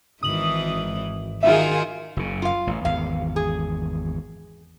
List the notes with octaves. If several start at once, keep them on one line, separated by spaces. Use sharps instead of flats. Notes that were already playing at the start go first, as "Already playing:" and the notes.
G#1 D#3 E3 D#6 F#7
D#3 D#4 F4 F#4 G#4 A#4 E5
F#1 C#3
F4 F5
A1
G#1 E2 F5
G#4